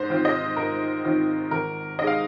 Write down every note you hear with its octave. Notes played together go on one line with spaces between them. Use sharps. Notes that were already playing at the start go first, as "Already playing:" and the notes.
Already playing: G#2 C5
D#3 C4 F4
D#5
G#2 A#4
D#3 C4 F4
G#1 A#4
G#2 G#3 D#5
F5